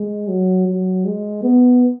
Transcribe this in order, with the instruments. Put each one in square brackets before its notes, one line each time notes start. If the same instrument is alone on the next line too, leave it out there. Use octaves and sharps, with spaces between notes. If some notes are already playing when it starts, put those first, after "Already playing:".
Already playing: [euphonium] G#3
F#3
F#3
G#3
B3